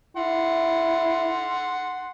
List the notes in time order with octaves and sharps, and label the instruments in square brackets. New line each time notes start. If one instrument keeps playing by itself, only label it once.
[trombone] E4 [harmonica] F#5 C6